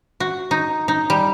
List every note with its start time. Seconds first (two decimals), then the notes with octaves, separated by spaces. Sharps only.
0.20 F#4
0.51 D#4
0.88 D#4
1.10 G3